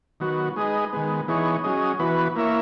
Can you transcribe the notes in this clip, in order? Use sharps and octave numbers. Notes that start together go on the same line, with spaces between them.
D#3 F#3 B3 F#4
G#3 D#4 G#4 B4 D#5
D#3 G#3 B3
E3 B3 D#4 G#4 C#5
F#3 C#4 G#4 D#5
E3 B3 F#4 B4
A#3 E4 A#4 C#5 E5